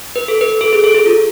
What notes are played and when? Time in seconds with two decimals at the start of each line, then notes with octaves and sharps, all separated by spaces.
0.16 B4
0.28 A4
0.41 B4
0.61 A4
0.73 G#4
0.84 A4
0.94 G#4
1.06 F4